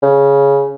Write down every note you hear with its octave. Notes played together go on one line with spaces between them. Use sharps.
C#3